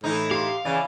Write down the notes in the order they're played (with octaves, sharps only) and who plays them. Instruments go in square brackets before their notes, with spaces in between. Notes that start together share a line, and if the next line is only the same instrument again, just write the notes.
[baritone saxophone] A2 [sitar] E3 D#4
[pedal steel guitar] G4 C6 [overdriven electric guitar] F5
[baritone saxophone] C#3 [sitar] E3 [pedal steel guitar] D5 G#5